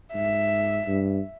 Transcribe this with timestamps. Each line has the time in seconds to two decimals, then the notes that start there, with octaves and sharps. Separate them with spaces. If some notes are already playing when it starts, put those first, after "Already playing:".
0.14 G#2 E5
0.87 G2